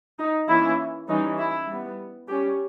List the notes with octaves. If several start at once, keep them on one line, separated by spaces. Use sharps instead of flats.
D#4
E3 A#3 C#4 E4
E3 G3 C#4 D#4
E4
G3 B3
G3 C#4 G4